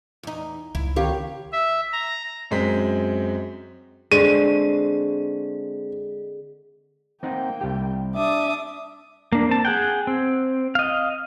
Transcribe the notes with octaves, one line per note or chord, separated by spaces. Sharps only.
E2 D#4
C#2 E4
D#3 G4 C#5 F5
E5
A#5
F#2 G#3 C4 B6
D3 G#3 C4 G#4 D#7
A#3 C4 D#4 F#5 G5
C2 G4
D4 E5 D6 D#6
A#3 D4
C4 A5
G#4 F#5 G5
C4
D#5 F5